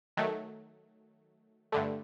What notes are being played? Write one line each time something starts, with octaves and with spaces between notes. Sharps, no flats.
D#3 F#3 A3
G2 D3 A3